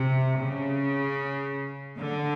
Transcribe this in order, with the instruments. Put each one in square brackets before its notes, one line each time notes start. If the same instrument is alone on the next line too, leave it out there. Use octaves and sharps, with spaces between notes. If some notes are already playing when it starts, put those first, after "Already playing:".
Already playing: [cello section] C3
C#3
D3